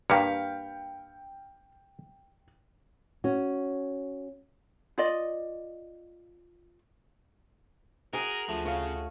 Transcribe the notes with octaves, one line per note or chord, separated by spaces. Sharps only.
G2 A#3 F5 G5 B5 C#7
C#4 F#4
F4 D5 D#5
F#4 G#4 A#4
D2 F3 A3 F4
C#3 C#5 F5